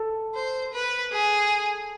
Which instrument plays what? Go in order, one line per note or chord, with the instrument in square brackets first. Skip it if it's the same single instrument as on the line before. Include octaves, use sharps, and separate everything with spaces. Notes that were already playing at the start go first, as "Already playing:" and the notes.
Already playing: [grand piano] A4
[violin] C5
B4
G#4